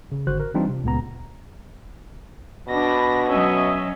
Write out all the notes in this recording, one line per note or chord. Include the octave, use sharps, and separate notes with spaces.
C#3
G#1 D3 F#4 C5 F#6
A#4
E3 G3 C4 D4 D#4 F4
C3
C#2 A#2 C#3 B3 A#5
B2 D4 B5 A#6
F#3 C#4 D#5 E5